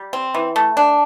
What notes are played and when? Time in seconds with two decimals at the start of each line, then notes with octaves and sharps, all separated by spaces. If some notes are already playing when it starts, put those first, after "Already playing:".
Already playing: G3
0.13 C4
0.34 E3
0.56 A3
0.77 D4